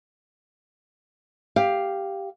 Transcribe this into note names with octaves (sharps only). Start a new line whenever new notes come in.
G4 F5